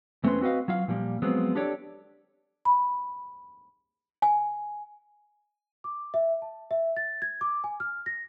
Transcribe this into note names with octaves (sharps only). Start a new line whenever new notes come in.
E2 A3 C4 C#4 B4 C6
C4 F#4 B4 D#5 F5
F#3 F4 F5
A#2 F3 G3 A3 A#3
F3 F#3 G#3 B3 C4
D4 G4 A4 C#5 D5
B5
G#5
D6
E5
A5
E5
A6
G#6
D6
G#5
F6
A#6